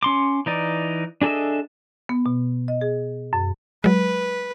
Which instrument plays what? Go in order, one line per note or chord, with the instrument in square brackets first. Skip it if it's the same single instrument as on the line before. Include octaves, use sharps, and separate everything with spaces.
[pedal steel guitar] C#4 C6 D6
E3 D#4 D5
D4 G#4 A4 D#5 E5
[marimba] B3
B2
D#5
G#4
F#2
[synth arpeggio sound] F#3 G#3 [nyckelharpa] B4